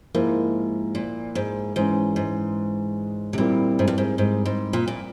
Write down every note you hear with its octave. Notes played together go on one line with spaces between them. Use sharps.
G#2 F3 A#3 E4 A#4
A#2
G#2
G#2 E3 G#3 C#4
G#2
C3
A#2 G3 C4 E4 A#4
G#2
G2
G#2
G#2
G#2
A#2
A#2